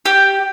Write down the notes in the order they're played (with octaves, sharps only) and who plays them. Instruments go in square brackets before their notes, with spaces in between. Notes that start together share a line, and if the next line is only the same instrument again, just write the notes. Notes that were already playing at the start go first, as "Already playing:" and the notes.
[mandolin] G4